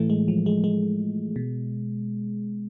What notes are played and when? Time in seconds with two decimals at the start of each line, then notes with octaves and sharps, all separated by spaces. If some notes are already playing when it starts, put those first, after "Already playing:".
Already playing: A2 E3 A3
0.10 G#3
0.28 F3
0.46 G#3
0.64 G#3
1.36 B2